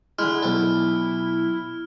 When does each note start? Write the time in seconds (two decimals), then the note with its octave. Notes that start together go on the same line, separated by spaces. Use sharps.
0.19 D3 G#3 E4 F6
0.43 B1 A4